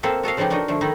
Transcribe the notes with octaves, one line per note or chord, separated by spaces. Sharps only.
A#3 C4 A4 C5 E5
F#4 A4 D#5 F5
C#3 F3 B3 D#4 G4
D4 D#4 F#4 A#4 D#5
D3 F3 A3
D#3 D#4 E4